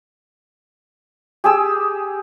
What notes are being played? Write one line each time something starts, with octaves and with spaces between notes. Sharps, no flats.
G4 G#4 E6